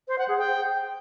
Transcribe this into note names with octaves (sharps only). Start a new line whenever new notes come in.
C5
F#5
G#4
G5